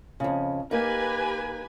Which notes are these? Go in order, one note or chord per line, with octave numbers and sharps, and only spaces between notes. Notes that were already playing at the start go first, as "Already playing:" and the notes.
F2 C#3
A#3 D#4 G4 B4 G#5